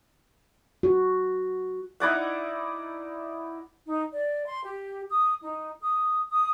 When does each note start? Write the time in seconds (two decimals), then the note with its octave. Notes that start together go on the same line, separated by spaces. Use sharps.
0.83 F#4
2.00 D#4 E4 D5 F#5
3.85 D#4
4.12 D5
4.47 C6
4.64 G4
5.09 D#6
5.41 D#4
5.81 D#6
6.30 D#6